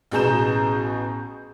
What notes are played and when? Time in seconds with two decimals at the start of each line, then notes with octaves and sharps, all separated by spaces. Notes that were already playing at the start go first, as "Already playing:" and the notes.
0.11 A1 B2 G#4 A#5 G6 E7